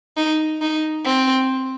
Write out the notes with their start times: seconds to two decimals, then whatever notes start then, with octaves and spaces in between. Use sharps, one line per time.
0.17 D#4
0.61 D#4
1.05 C4